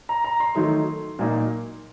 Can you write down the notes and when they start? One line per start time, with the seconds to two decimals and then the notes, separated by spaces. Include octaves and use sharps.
0.09 A#5
0.24 A#5
0.40 C6
0.55 D#3 F#3 A3 D#4 C6
1.19 A#2 F#3 A#3 D#4